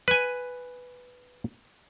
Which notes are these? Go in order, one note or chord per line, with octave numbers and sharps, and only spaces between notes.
B4 G#5